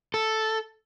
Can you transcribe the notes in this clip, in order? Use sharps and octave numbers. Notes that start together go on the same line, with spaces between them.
A4